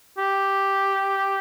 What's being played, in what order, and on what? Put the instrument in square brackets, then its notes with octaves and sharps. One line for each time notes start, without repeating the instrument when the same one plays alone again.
[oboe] G4